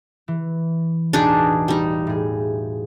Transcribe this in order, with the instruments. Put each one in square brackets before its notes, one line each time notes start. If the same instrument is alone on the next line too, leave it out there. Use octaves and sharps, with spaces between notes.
[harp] E3
[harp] E1 A1 [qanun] D4 D#4 G#4
[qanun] G3 D#4
[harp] A2 G#4